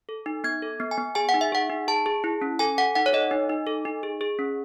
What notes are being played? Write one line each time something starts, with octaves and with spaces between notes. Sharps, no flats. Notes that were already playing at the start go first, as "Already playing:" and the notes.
A4
D#4
B3 G#6
A4
B3
G#5
B3
G#4 G#5
F#5
D#4
E5
G#4 F#5
D#4
G#4 A5
G#4
E4
C#4
A4 G#5
A4 F#5
D#4 F#5
C#5
A4 D#5
D#4
D#4
A4
D#4
G#4
G#4
C#4